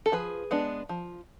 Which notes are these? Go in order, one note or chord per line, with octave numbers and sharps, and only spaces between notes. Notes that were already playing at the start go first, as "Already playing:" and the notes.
A4
F3 G#4 B4
G#3 B3 D4
F3